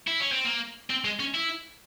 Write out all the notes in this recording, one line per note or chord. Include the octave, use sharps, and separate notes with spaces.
E4
C#4
C4
A#3
C4
G#3
C#4
E4